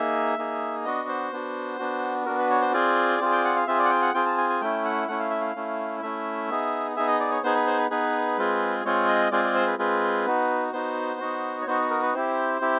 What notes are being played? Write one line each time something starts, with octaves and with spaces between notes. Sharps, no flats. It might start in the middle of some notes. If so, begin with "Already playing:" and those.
Already playing: A#3 D#4 G#4 E5
A#3 D#4 G#4
B3 D4 F#4 D#5
C5
B3 D4 F#4
B3 D4 F#4
B3 D4 F#4 A#4
B4
C#5
C5
C4 F4 G#4 D5
C4 F4 G#4
G5
F#5
F5
C4 F4 G#4 E5
D5
F#5
G5
F#5
C4 F4 G#4 G5
A5
G#5
G#5
A3 C#4 E4 G5
F#5
A3 C#4 E4 F#5
F5
E5
F5
A3 C#4 E4
A3 C#4 E4 E5
B3 D#4 G#4
B3 D#4 G#4 E5
D#5
D5
C#5
B3 D#4 G#4 C5
B4
C5
B4
B3 D#4 G#4 B4
G#3 C4 F4 G#4
G#3 C4 F4 G#4 C#5
D#5
G#3 C4 F4 G#4 D5
D5
C5
B4
G#3 C4 F4 G#4 B4
B3 D#4 F#4
B3 D#4 F#4 C5
B3 D#4 F#4
C#5
B3 D#4 F#4 C5
A#4
B4
C4 E4 G4 C5
C4 E4 G4